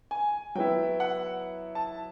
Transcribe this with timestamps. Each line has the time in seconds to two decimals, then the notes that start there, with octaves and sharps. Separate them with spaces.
0.11 G#5
0.55 F#3 B3 E4 G5
1.00 F#5
1.75 A5